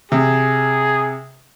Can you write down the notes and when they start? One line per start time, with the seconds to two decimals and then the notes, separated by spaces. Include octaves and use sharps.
0.12 C3 G#4